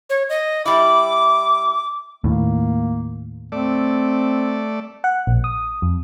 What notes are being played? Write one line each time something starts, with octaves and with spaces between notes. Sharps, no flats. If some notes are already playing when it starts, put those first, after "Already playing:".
C#5
D#5
G3 E4 D6
D#2 A2 A#3
A3 C4 D5
F#5
A#1
D#6
F2